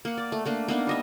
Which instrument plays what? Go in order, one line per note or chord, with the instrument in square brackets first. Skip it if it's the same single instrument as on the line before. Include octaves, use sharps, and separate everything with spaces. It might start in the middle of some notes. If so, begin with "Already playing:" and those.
[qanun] A#3 F#5
D5
A3
A3 A#3 D4
A#3 B3 D4 D#4
G3 D#5 E5